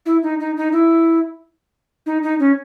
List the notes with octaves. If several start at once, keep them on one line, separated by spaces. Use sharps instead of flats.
E4
D#4
D#4
D#4
E4
D#4
D#4
C#4